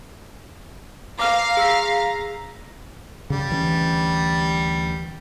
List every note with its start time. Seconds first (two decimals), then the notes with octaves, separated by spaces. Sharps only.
1.19 F5 A#5 D6 F6
1.57 G#4 E6 B6
3.30 C#3 G3
3.50 D2 E3 C#4